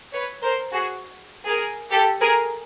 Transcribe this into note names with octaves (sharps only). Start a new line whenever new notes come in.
B4 C#5
A#4 C5
F#4 G#4
G#4 A#4
G4 A4
G#4 A#4